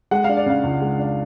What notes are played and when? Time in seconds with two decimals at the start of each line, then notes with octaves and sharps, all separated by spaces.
0.11 G#3 F#5
0.24 D4 F5
0.37 D5
0.46 C#3 F5
0.64 C#2
0.82 G#3
0.99 D4